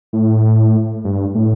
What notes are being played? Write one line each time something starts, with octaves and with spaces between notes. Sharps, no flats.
A2
G2
A2